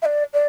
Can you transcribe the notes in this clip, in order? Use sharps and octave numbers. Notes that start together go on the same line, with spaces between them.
E5
D5
D5